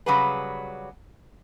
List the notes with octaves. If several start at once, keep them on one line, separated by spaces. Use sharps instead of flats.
C#3 F#3 G3 F#4 G#4 B4